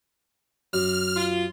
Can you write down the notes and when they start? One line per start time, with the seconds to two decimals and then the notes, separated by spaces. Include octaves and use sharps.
0.73 F#2 F6
1.17 F4